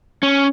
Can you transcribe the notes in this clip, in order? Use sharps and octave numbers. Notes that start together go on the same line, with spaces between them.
C#4